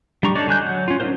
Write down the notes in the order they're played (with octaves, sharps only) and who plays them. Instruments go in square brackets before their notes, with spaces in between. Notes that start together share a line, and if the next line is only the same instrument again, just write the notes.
[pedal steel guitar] G3 D4 A#5 C#6 D6
D4 D#4 A4 C#5 D5
D3 G#5 F#6 G6
F#3 F#5
C#4 F4
D4 D#4 F4 A#4 C5